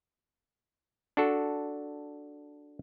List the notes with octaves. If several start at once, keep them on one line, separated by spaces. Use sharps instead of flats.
D4 F#4 A4